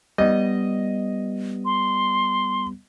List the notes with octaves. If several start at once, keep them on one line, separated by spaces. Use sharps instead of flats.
G3 B3 D#5
C6